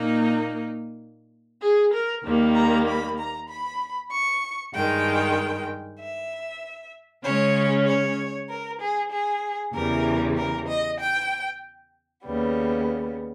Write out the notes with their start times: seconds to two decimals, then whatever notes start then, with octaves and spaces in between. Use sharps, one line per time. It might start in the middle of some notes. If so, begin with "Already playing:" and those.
Already playing: A#2 A#3 D#4
1.61 G#4
1.93 A#4
2.24 D#2 D#3 G3 A#3
2.55 A#5
2.87 B5
3.18 A#5
3.49 B5
4.11 C#6
4.73 G2 D#3 G#3 G5
5.99 E5
7.24 C#3 G#3 C#4 C#5
7.86 C#5
8.49 A#4
8.80 G#4
9.11 G#4
9.73 E2 C#3 E3 G3 A#4
10.37 A#4
10.67 D#5
10.99 G5
12.24 D#2 C#3 G3 B3